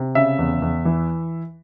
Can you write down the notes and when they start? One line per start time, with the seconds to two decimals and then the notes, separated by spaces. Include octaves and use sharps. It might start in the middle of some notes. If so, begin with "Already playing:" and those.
Already playing: C3
0.15 C#3 E5
0.39 E2
0.62 E2
0.85 E3